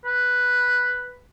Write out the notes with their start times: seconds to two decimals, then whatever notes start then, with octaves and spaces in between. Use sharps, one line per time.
0.05 B4